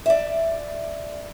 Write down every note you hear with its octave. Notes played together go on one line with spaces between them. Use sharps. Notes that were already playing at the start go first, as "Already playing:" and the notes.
D5 E5